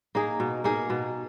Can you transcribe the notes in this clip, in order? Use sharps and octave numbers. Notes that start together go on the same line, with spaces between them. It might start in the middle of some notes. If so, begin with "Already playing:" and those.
A#3 D#4 G#4
B2
A#3 D#4 G#4
B2